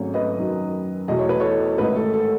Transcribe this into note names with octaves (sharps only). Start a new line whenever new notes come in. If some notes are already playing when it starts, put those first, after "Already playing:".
Already playing: G#1 G#2 F#3 A3 C#4
B4 D#5
F#2 D#3 F#3
E2 B2 A3 D#5
C#5
B4
A4 C#5
A1 G#2 D#3 A3 D#4 B4
A4
A4